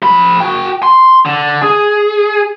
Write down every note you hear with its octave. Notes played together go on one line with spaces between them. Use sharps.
F3 B5
F#4 G5
C6
D3
G#4